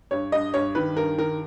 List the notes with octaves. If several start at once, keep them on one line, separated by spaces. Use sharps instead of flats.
G2 C#5
G2 D#5
G2 C#5
D#3 B4
G2 A#4
D#3 A#4